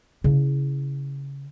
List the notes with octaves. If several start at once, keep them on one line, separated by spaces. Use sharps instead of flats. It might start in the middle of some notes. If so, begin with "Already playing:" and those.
C#3 E4